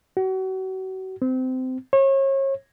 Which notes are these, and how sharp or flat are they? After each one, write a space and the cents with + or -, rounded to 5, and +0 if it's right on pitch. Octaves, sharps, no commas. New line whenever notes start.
F#4 +35
C4 -25
C#5 -35